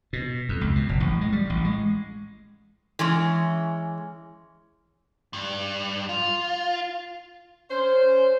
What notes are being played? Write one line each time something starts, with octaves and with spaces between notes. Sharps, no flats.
B2
F2
C#2
B2
F#1
A1
G#3
G3
A1
G#3
E3 G#3 C#4
G2
F4
C#4 C5